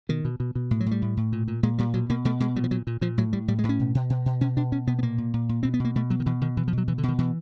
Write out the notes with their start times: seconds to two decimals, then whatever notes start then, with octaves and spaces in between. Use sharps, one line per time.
0.09 B2 D#3
0.25 B2
0.40 B2
0.55 B2
0.71 A2
0.80 F#3
0.86 A2 G3
1.02 A2
1.17 A2
1.32 A#2
1.48 A#2
1.63 A#2 G#3
1.78 A#2 G3
1.94 B2 F#3
2.10 B2 A#3
2.25 B2 A3
2.40 B2 G#3
2.56 A#2 G3
2.64 F3
2.71 A#2 F#3
2.87 A#2
3.01 A#2 F3
3.18 A2 F#3
3.33 A2 G3
3.48 A2 G3
3.59 G#3
3.64 A2
3.69 C#4
3.79 B2
3.95 B2
4.10 B2
4.26 B2
4.41 B2 C#4
4.56 B2 D4
4.72 B2 C#4
4.87 B2 B3
4.99 B3
5.02 A#2 A#3
5.18 A#2
5.34 A#2
5.49 A#2
5.63 B2 C4
5.74 B3
5.80 B2 A#3
5.95 B2 A3
6.10 B2 F#3
6.20 D#3
6.26 B2 E3
6.41 B2 D#3
6.57 B2 E3
6.68 F3
6.73 B2 F#3
6.88 B2 E3
6.98 D3
7.03 B2
7.08 D#3
7.19 B2 E3